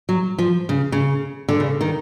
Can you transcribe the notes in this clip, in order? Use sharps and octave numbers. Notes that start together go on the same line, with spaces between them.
F#3
F3
C#3
C#3
D3
C#3
D#3